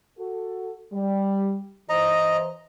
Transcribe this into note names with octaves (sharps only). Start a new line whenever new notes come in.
F#4 A4
G3
E3 C5 D#5 A#5